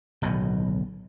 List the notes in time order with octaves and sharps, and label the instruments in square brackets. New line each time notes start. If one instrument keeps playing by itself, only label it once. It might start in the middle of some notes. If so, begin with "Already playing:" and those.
[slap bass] D1 B1 B2 D#3